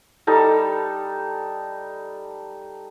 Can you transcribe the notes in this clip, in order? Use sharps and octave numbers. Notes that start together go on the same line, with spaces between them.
G3 D#4 A4